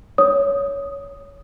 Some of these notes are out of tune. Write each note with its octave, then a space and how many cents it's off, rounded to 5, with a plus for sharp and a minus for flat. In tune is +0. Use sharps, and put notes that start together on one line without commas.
C#5 +15 D#6 +0